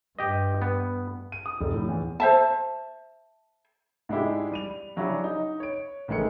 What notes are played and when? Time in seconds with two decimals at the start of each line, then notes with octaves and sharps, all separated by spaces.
0.19 G2 G4 D#5
0.62 B3
1.32 D#7
1.46 D#6
1.61 F1
1.74 A2
1.88 E2
2.20 C5 E5 A5
4.09 G#2 G#3 D4 E4 G4
4.52 G3 D#7 F7
4.96 C#3 F#3 C#4 D4 E4 G4
5.24 D#4
5.60 C#5 D7
6.08 A1 D#3 G#3 A3 C#7